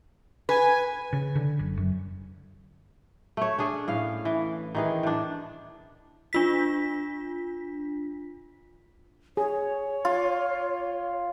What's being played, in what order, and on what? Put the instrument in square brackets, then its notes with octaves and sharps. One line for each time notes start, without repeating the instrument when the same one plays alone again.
[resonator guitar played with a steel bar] B4 [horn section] G#5
[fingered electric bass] C#3
D3
F#1
F#2
[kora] A3 C#5
C#4 D4 G#4
A2 F5
E3
D#3 E3 G#4
A2 D4
[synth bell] D4 F4 B6
[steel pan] G#4 [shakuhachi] C#5
[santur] F4